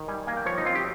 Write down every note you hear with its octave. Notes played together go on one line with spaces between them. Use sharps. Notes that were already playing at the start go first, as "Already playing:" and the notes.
Already playing: D#3
G3 G#5
A#3 G#5
G5
F3 C#5
D#4
C4 F4
G4